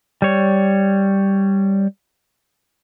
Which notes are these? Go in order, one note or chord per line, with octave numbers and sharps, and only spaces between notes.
G3 C#5